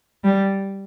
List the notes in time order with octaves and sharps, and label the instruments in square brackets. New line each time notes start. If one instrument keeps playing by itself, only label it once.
[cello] G3